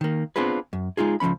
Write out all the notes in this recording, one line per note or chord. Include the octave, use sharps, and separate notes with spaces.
D#3 A#3
B3 C4 D4 F4 G#4 B4
F#2
G#3 D#4 F4 G#4
C#2 F3 G#3 C#4 B5